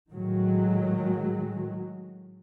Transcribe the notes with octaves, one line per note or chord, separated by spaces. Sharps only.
A2 D#3 F#3 G#3